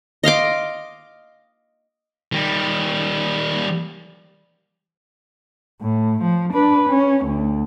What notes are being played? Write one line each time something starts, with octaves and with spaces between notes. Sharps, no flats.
D#5 F5 C6 D6
D#3 G3
A2
F3
D4 B4
C#4
D2